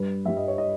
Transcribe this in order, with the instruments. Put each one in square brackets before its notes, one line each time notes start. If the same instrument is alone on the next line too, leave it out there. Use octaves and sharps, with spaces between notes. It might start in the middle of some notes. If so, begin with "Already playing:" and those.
Already playing: [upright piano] G2 G3 B4
G2 G3 E5
D#5
C#5
D#5